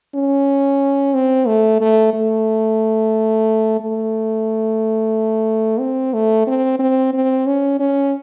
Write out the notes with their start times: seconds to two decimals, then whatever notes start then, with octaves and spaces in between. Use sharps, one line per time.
0.15 C#4
1.14 C4
1.47 A3
1.81 A3
2.14 A3
3.80 A3
5.79 C4
6.14 A3
6.47 C4
6.79 C4
7.13 C4
7.47 C#4
7.80 C#4